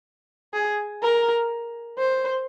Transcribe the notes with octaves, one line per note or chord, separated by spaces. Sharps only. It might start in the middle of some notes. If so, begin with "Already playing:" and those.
G#4
A#4
C5